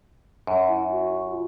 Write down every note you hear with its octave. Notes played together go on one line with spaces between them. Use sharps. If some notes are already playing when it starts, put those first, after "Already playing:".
F#2
E4
F#4
F4